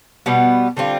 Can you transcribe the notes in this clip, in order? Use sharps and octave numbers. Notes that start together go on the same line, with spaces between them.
B2 G3 B3
D3 G3 C4 F4